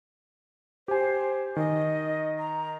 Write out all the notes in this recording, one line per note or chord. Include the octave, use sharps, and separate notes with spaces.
G4 C5 G#5
D#3 D#5
A#5